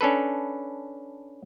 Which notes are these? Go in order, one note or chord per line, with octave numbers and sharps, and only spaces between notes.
C#4 D4 A4 B4